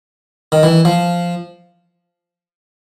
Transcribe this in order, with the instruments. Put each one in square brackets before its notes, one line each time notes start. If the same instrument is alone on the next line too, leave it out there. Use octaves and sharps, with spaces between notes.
[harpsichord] D#3
E3
F3